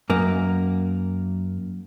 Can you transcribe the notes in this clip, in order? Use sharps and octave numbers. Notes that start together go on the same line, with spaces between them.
F#2 A#3